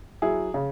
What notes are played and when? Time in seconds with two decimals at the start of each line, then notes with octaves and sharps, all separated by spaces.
0.22 F#3 E4 G#4
0.54 C#3